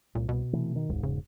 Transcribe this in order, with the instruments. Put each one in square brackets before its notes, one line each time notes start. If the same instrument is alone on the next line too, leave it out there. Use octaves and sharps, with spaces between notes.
[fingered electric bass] C2 [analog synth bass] A#2
[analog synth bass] B2
[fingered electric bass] C3 E3 A3
D#3
[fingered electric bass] E1 G#2 [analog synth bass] C#2
[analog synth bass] C#3